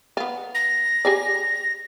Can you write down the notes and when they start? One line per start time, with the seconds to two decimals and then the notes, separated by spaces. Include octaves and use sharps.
0.17 B3 F4
0.55 A#6
1.05 G4 G#4 D5